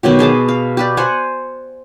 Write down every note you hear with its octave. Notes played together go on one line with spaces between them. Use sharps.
B2 D#3 F#3 G4
G#4 D#5 A5 D6
F5
G4 B4 D5
C5 F#5 G#5